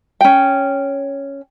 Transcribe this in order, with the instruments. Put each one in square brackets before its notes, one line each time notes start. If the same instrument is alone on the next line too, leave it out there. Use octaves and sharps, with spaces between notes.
[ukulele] C#4 G5